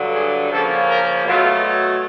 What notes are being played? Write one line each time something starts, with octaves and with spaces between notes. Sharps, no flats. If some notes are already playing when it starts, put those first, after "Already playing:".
Already playing: G2 D3 F#3
G#4
C#3 F3 A#3 C#4 A4
A#4
B2 F#3 A3 F4